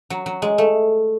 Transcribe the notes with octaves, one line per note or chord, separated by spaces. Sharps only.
F#3
F#3
G#3
A3